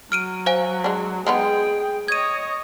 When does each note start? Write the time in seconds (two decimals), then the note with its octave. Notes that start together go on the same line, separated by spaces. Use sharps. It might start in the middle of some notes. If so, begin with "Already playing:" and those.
0.12 F#3 F6 D7 D#7
0.46 C5 F5 G#5
0.84 G#3 D4
1.27 G#3 B3 D#4 G#4 G5
2.08 C#5 D#5 G#6 D#7